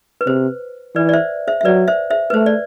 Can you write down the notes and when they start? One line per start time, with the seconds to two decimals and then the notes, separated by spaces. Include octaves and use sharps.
0.21 B4
0.27 C3 C5
0.95 E3 B4 D5
1.09 D5
1.13 C5 E5
1.48 C5 E5
1.61 E5
1.65 F#3 B4 D5
1.88 C5 E5
2.10 C5 E5
2.30 B4
2.33 A3 C5
2.46 D5